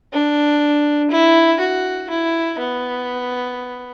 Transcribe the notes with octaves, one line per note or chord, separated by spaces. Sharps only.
D4
E4
F#4
E4
B3